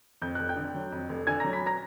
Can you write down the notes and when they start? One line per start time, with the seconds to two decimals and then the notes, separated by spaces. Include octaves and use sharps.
0.22 F2 G6
0.35 F1 F#6
0.49 G5 G6
0.56 D3
0.74 F#3
0.92 F2
1.09 F1
1.27 D3 G#5 G#6
1.40 A#5 A#6
1.44 F#3
1.53 B5 B6
1.66 A#5 A#6